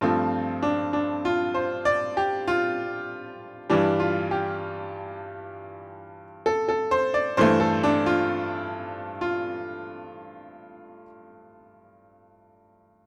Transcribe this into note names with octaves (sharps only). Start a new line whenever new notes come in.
G2 F3 A3 C4
D4
D4
F4
C5
D5
G4
F4
G2 E3 G3 D4
F4
G4
A4
A4
C5
D5
G2 E3 A3 C5
A4
D4
F4
F4